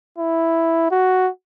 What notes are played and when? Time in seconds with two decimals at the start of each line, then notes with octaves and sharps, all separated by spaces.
0.19 E4
0.91 F#4